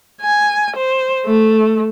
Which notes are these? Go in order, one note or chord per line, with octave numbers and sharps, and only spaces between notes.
G#5
C5
A3